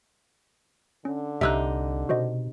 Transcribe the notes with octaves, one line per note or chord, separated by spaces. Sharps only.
D3 C#4
C2 C3 D#4 E5 E6 F#6
B2 F#4 C5 D#5